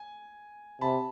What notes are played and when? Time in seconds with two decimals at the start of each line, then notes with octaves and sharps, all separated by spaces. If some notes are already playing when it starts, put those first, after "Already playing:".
Already playing: G#5
0.81 C3 A5 B5